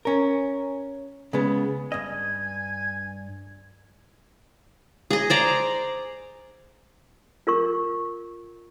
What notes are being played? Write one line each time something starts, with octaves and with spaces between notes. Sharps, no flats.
C#4 A#4
C#3 G#3 B3
G2 D#5 G#5
G#4 D#5
C5 D5 A#5
F4 A#4 C#6